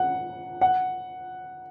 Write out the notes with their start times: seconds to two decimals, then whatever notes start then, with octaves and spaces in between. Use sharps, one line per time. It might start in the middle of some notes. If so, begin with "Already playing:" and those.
Already playing: F#5
0.61 F#5